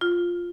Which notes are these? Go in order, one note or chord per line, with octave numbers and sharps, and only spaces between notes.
F4